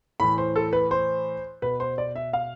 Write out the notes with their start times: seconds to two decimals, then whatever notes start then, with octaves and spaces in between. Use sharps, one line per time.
0.20 A2 E3 B5
0.38 C5
0.56 A4
0.73 B4
0.91 C5
1.62 B2 B4
1.80 C5
1.98 D5
2.16 E5
2.33 F5